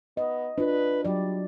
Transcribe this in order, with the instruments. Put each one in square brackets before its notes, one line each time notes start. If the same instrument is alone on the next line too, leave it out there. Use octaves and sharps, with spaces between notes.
[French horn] B3 [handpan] D#5
[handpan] D4 F4 [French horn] B4
[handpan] F#3 D5 [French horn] G3